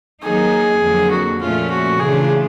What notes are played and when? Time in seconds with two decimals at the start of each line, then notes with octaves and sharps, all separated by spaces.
0.22 D#3 F#3 A#3 D#4 G#4
0.81 F2 D3 F#3 A#3
1.11 F#4
1.40 A#2 F3 A3 C#4 F4
1.70 F#4
1.99 C#3 E3 A3 D4 F4 G#4